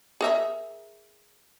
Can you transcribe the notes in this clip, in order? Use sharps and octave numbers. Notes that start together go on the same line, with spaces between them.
G#4 A#4 E5